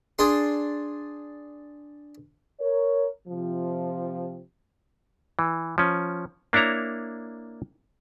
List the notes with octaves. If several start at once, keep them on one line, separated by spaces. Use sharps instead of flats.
D4 G#4 C6
A#4 C#5
C3 F3
E3
F3 C#4
A#3 D4 E4 C#5 A#5